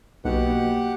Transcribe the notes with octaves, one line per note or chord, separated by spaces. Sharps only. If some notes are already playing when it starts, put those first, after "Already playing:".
B1 B2 A#3 G4 F#5